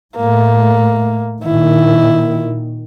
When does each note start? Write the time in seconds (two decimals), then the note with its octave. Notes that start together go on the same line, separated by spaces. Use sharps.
0.17 A2 A3 A#3
1.44 A#2 D#3 E4